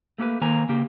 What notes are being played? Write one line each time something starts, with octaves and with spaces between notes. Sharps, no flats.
A3 A#3 G4 A4 B4
D#3 A#3 C5 G#5 A#5
C#3 A#3 G4